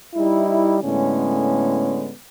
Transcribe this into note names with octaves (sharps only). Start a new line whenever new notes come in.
G3 D#4 E4
A2 D3 G#3 B3 C#4